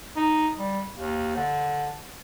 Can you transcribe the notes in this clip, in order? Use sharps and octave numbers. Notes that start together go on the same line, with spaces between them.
D#4
G3
D#2
D3